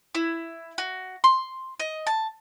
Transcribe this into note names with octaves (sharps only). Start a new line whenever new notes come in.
E4
F#4
C6
D#5
A5